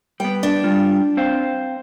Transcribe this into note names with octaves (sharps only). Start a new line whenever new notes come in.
G3 B3 G5
D4
G3 F4
C4 C5 F5